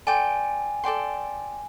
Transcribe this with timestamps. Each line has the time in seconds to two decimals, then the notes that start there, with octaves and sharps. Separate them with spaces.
0.07 A4 D5 G5 G#5 C6
0.84 A4 D5 G5 C6